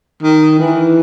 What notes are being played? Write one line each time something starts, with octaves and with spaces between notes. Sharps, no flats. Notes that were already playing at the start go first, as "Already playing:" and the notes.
D#3
E3